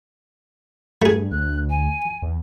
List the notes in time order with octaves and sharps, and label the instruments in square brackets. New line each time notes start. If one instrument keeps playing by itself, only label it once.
[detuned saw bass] G2 [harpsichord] A3 G#4
[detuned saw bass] D2 [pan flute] F#6
[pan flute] G#5
[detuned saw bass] E2